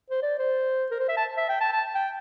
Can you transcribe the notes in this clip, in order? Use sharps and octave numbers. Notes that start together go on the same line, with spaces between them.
C5
D5
C5
A#4
C5
E5
A5
E5
G5
A5
A5
G5